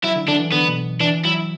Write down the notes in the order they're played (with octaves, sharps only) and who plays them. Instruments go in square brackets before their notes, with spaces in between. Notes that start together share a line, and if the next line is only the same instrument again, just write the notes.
[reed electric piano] F#3 [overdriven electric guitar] E4
[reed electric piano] D3
[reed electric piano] D3 [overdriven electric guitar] D4
[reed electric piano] E3
[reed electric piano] D3 [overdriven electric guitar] B3
[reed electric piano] B2
[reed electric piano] E3 [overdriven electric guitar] D4
[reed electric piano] F#3 [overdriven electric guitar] E4